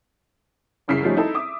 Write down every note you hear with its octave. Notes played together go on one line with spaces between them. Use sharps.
F#1 C2 C#3 E4 B6 C7
F3 G3 A3 C#4 D#4
D#4 E4 A4
E5 D6 D#6